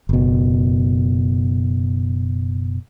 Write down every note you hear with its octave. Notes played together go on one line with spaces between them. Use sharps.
F#1 B2